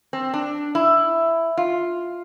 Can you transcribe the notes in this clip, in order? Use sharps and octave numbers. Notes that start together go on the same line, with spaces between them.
C4
D4
E4
F4